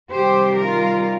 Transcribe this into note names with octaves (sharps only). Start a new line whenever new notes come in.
C3 D#3 G3 G4 C5
F4 A#4